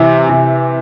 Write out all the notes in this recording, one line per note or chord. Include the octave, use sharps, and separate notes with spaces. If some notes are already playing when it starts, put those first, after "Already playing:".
Already playing: C3 E3
C3